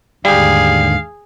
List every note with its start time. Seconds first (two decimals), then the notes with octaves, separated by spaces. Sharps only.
0.25 D#2 G#2 D3 G3 G4 G#4 F5